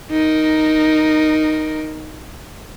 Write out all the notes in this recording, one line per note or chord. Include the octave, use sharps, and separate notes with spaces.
D#4 A#4